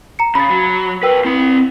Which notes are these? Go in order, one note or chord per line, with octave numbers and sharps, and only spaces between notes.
A#5 C#7
C#3 B5 A6
F#3
C2 A#4 B4 G5 E6
C4 E4 B5